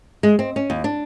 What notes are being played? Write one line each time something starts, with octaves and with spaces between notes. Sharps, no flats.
G#3
C4
C#4
D#2
D4